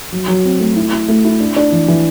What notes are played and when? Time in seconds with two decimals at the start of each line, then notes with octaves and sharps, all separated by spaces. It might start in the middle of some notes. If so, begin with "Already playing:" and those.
0.12 F#3
0.28 F#3
0.45 C4
0.60 A3
0.76 E4
0.93 E4
1.08 A3
1.25 E4
1.40 D4
1.56 D4
1.72 E3
1.88 E3